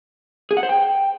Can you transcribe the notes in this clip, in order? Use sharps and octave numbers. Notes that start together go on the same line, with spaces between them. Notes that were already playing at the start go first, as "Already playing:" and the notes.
G#4
F#5
C5
G5